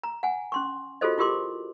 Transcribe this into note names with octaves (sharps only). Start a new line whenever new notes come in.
A#5
F#5 G#5
C#4 C6 C#6
F4 F#4 G#4 A4 C5 D#5
E4 F4 G4 A#4 C6 D6